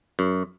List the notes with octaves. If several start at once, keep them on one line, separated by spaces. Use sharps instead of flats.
F#2